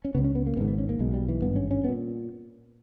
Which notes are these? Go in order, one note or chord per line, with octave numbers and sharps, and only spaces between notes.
C#4
C#2 C#3 B3
C#4
B3
A#3
G#1 G#2 B3
B3
C#4
A#3
B1 B2 G#3
G3
E3
G#1 G2 B3
C#4
C#4
B3
A#2